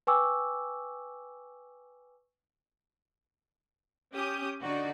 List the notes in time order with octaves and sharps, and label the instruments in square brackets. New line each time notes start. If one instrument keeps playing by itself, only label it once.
[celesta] B4 G5 G#5 C#6 D6 E6
[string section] C#4 G4 D#6 G6
D3 D#4 F#4 D5